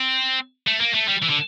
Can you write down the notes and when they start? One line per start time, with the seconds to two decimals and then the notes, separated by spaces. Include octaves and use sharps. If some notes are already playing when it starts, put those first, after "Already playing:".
Already playing: C4
0.67 A3
0.80 A#3
0.94 A3
1.08 G3
1.22 E3
1.29 D3